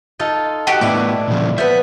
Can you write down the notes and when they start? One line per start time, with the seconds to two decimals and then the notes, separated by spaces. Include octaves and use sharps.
0.19 D#4 F4 A4
0.67 D#4 F#4 G4
0.81 A2 B3 D4 E4 D6
1.28 A#2 C#3 F3
1.58 F3 B3 E5 G6